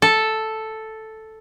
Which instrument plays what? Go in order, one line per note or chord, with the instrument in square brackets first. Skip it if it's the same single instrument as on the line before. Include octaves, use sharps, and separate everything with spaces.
[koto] A4